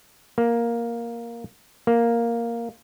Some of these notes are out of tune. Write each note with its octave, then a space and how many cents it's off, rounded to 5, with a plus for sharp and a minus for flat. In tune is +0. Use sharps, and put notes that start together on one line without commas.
A#3 +5
A#3 +0